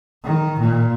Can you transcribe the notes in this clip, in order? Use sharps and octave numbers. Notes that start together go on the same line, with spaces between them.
D#3
A#2